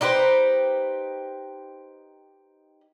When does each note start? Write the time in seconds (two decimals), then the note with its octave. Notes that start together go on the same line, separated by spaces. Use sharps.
0.01 D#4 G4 B4 C5